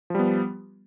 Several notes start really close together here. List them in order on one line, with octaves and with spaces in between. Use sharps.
F3 G3 B3